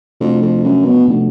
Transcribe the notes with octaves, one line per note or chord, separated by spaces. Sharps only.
F2 C3 F3 A3 D4 F#4
F2
F#2
B2
C3 F3 A3 D4 F#4